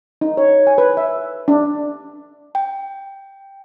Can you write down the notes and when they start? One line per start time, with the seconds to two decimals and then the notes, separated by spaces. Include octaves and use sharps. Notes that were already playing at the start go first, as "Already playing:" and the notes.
0.21 D#4
0.37 C#5
0.67 G#5
0.78 B4
0.97 E5
1.48 D4
2.55 G5